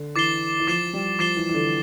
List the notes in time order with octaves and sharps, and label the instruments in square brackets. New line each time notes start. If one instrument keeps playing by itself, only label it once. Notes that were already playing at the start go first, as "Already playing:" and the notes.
Already playing: [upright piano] D3
[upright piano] E3 [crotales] D6 A6 C7 E7 G7
[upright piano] E3
[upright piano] F3 [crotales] D6 A6 C7 E7 G7
[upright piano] G3
[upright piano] F3 [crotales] D6 A6 C7 E7 G7
[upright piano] E3
E3
D3